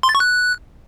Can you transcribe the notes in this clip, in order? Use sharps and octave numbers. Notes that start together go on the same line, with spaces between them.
C6
A6
C#6
F#6